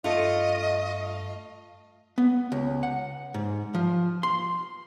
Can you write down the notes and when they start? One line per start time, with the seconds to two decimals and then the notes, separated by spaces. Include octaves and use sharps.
0.04 G2 A3 F4 D#5
2.18 B3
2.52 C#2
2.83 F#5
3.34 G#2
3.75 F3
4.23 C6